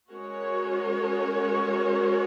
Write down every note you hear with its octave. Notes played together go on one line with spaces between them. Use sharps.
G#3 C#4 F#4 A#4 C#5